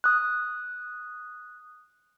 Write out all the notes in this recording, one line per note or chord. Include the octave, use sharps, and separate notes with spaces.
D#6 F#6